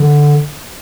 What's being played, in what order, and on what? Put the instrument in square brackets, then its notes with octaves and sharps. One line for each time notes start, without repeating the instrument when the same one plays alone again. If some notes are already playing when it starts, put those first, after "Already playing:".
Already playing: [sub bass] D3